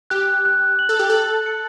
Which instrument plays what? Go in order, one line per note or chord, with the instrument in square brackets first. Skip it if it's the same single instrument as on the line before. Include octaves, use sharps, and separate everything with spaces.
[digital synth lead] G4 [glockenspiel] F#6
[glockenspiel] F#6
F#7
[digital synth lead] A4
G4
[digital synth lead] A4 [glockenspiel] F#7
[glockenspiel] C#7